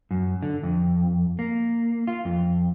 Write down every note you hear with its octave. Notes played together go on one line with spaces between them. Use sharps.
F#2
D3
F2
A#3
F4
F2